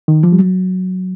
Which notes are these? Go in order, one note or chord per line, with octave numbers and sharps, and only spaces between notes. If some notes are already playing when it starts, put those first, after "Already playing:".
D#3
F3
G3
F#3